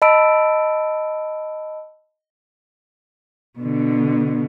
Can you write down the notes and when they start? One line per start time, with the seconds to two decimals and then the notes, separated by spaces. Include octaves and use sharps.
0.02 D#5 A5 B5 E6 D7
3.59 B2 D3